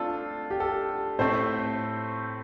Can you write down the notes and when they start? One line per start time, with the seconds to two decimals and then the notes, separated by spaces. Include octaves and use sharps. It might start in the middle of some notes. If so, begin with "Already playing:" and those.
Already playing: A3 C4 D4 F4 A4
0.50 G4
0.60 A4
1.19 A2 A3 C4 C5